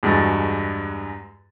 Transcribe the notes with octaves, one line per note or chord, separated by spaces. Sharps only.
E2 G2 G#3 F#4 A6